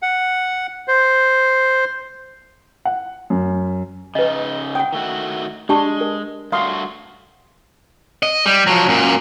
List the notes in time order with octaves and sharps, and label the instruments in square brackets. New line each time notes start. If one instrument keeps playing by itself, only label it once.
[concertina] F#5
C5
[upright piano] F#5
F#2
[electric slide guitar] C#3 D#4 [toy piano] B4 D#5
[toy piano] F#5 D#6 [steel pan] G5
[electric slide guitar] D#3 A3 F#4
[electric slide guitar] G#3 [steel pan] D4 [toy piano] G4 A5 C#6
[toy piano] A#4
[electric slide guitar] G2 A3 F#4 [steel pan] F5 C6 [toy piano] D#6
[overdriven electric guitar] D#5
G3
F3 F#3
F#2 A#2